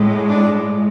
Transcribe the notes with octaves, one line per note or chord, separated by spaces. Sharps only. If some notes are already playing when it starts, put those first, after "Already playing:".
Already playing: A2 G#3
D4